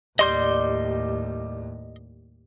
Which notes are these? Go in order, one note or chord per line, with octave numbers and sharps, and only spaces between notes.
D#2 A2 G3 D#5 C6 G6